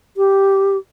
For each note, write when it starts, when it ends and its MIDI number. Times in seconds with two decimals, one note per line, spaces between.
0.17 0.77 67